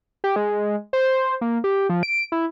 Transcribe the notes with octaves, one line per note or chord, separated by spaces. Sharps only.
G4
G#3
C5
C5
A#3
G4
F3
D7
E4